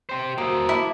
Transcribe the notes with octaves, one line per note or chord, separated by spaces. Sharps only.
G4 C5
A#3 F#4 C5 E5 D#6
E4 A5 D6